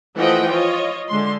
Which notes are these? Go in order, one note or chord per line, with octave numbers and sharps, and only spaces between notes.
E3 F3 A3 D#5 F#5 G5
F4 C#5 D#5
D3 G#3 C6